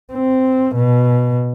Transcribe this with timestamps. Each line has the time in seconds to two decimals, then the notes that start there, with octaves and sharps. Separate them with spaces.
0.12 C4
0.76 B2